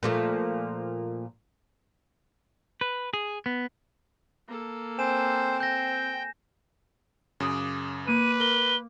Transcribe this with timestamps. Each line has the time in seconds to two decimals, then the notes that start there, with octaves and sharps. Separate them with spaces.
0.03 A#2 F3 A3
2.81 B4
3.14 G#4
3.46 B3
4.49 A#3 A4
4.99 C4 C5 G#5 E7
5.60 G5 G6 A#6
7.40 F#2 C#3 D6 D#6 F#6
8.08 A#3 B4 D6 D#7
8.40 A#4 G7